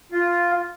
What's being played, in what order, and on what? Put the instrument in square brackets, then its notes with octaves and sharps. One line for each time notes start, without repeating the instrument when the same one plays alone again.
[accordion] F4